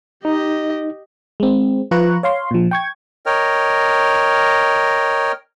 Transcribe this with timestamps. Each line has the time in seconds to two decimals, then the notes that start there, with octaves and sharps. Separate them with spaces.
0.25 D#4 G4 D#5
1.40 G#3 C4
1.91 F3 F4 B4 A#5 C#6 F#6
2.23 C#5 F5 C6
2.51 A#2 F3
2.71 G5 C#6 G#6
3.26 A#4 C#5 D#5 G5 F6